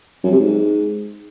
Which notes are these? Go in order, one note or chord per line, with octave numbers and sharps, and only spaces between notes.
F#2
C3
G#2